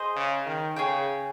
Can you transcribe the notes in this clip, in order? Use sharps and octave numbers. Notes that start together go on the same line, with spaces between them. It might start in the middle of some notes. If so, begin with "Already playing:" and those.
Already playing: G#4 C5 D#5
C#3
D#3
C#3 G#4 C#5 G5